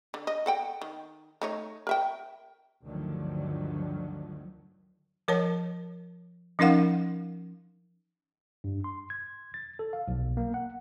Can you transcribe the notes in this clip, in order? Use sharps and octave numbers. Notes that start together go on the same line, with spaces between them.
D3
D#5
A4 F#5 G5
D#3
A3 D#4 C#5
A#4 E5 G5
D2 G2 D3 D#3 F3 F#3
F3 A#4 C#5 A5
F3 C#4 D#4 A#4 F5 F#5
G2
C6
G#6
A6
A4
F5
B1
A#3
F#5